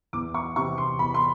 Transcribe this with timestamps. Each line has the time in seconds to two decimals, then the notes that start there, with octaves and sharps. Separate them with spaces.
0.13 E2 D6
0.34 C#6
0.56 C3 E3 C#6
0.78 C6
0.99 E2 B5
1.14 C6